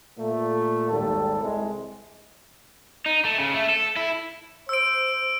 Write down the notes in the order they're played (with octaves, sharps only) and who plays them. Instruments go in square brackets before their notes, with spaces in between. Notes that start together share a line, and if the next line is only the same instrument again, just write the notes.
[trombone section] A#2 A3
G#1 D#2 G3 A4
C2 C3 G#3
[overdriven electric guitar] D#4
A3
C#3
A3
A4
E4
[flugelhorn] C5 [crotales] E6 D7